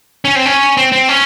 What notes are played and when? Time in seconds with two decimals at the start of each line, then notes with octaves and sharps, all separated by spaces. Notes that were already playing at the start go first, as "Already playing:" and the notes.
0.25 C#4
0.36 C4
0.46 C#4
0.77 C4
0.92 C4
1.09 C#4